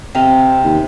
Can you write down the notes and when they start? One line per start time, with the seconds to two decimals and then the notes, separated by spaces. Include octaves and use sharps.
0.15 C3 C4 D#5 F5 G5
0.64 D#2